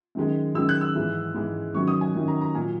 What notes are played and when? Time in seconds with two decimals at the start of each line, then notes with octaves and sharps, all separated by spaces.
0.15 F#2 D#3 G#3
0.55 F#2 D#3 G#3 E6
0.69 F#6
0.81 E6
0.95 G#2 E3 G#3
1.34 G#2 E3 G#3
1.75 F#2 D#3 F#3 C#6
1.87 D#6
2.01 G#5
2.15 F#2 D#3 F#3
2.28 A#5
2.41 A#5
2.54 A#2 G#5
2.57 F#3